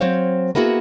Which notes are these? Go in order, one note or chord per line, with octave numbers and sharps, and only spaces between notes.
F#3 C4 C5 C#5 F5
A#3 B3 E4 F#4 G#4